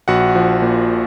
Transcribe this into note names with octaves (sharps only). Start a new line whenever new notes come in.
A#1 F#4 F#5
F3
A#2